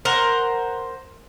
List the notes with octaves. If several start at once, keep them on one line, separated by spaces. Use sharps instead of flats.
A#4 C5 F#5